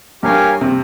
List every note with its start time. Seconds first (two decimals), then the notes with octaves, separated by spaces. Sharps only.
0.23 G2 G4 A#4 C#5 F5 G#5
0.61 C3